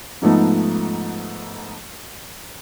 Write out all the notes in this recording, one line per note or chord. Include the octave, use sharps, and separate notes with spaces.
G#2 F3 A3 B3 D#4